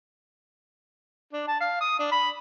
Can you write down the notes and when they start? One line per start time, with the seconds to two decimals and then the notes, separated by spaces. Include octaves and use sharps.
1.33 D4
1.48 A5
1.60 F5
1.81 D#6
1.99 D4
2.11 B5